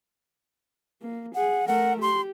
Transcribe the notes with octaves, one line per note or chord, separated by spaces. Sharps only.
A#3
G#4 F#5
A3 A#4 F#5
G4 C6